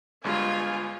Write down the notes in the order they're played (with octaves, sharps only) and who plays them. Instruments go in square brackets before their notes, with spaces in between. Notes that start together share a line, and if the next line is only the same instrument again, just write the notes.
[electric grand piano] G1 G2 G#3 [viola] F4 G#5